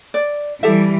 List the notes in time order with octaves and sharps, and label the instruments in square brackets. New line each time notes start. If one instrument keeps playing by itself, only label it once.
[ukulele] D5
[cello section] E3 G3 [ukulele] G4 A4 E5